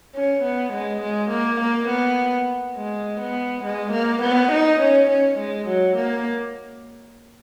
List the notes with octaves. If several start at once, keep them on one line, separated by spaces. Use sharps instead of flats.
C#4
B3
G#3
G#3
A#3
A#3
B3
G#3
B3
G#3
A#3
B3
D#4
C#4
C#4
G#3
F#3
A#3